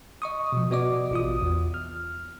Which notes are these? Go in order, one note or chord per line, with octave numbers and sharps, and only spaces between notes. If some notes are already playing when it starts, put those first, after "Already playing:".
D#5 C#6 D#6
B2 F3
B2 B3 F#4 D5 D#5 D6
A1 F4 D#6
E2
F6